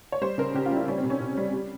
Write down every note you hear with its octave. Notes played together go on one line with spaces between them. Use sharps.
C#5
G3 C5
C#3 A#4
C#3 G4
F4
G3 E4
G3 C#4
C4
C3
C#4
C3
G3
G3